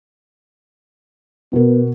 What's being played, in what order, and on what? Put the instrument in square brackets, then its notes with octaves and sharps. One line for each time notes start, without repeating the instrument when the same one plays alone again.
[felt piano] B2 A#4 [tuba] B3